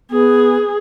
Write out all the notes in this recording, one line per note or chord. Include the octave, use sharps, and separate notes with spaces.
B3 G#4